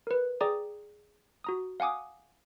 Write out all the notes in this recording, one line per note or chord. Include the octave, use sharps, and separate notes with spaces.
A#4 B4
G#4 D5 G5 A#5 D6 D#6
F#4 A#5 D#6
F5 F#5 G#5 D6 D#6